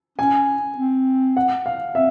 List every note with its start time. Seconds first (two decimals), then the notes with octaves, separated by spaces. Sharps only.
0.18 C#4 G#5
0.77 C4
1.37 F#5
1.66 F5
1.95 C4 E5